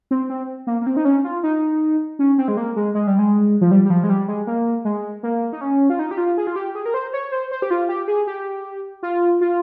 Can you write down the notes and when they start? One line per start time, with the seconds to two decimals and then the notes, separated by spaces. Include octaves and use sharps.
0.11 C4
0.30 C4
0.67 A#3
0.82 A#3
0.87 C4
0.97 D#4
1.05 C#4
1.24 F4
1.43 D#4
2.19 C#4
2.38 C4
2.48 G#3
2.57 A#3
2.76 G#3
2.95 G#3
3.07 G3
3.19 G#3
3.61 F3
3.71 G3
3.85 G3
3.90 F3
4.04 G#3
4.09 G3
4.28 G#3
4.47 A#3
4.85 G#3
5.23 A#3
5.53 D#4
5.61 C#4
5.90 F4
5.99 D#4
6.11 G4
6.18 F4
6.38 G#4
6.47 F4
6.56 G4
6.75 G#4
6.86 A#4
6.94 C5
7.13 C#5
7.32 C5
7.51 C5
7.62 G4
7.70 F4
7.89 G4
8.08 G#4
8.27 G4
9.03 F4
9.41 F4